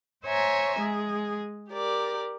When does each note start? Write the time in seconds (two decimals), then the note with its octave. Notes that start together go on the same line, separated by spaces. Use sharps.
0.25 C5 C#5 E5 G#5 A#5
0.80 G#3 G#4
1.71 G4 A#4 D5